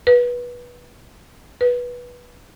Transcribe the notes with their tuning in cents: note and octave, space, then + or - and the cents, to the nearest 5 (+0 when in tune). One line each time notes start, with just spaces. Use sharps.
B4 -20
B4 -15